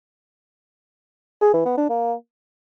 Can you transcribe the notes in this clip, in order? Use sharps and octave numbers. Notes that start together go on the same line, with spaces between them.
G#4
E3
B3
D4
A#3